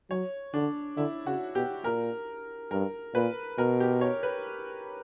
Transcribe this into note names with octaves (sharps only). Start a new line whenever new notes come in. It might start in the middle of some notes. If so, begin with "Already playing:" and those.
F#3 C#5
D3 D4
D3 E4
C#3 F#4
B2 G4
A#2 A#4
G2 A#4
A#2 B4
B2 A#4
G4
C#5
B4